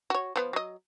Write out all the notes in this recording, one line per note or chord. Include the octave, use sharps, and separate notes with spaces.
F#4 C#5
F3 B3
F#3 D#5